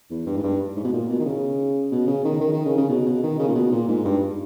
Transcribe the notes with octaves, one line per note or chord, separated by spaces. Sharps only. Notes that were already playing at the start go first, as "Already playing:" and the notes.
E2
G2
G#2
G2
G#2
B2
A#2
B2
D#3
C#3
B2
C#3
D#3
D#3
D#3
C#3
C#3
B2
B2
D#3
C#3
A#2
B2
A#2
G#2
G2